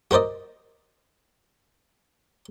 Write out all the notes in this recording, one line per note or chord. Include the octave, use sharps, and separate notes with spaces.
F#4 A#4 C5 D5 D#5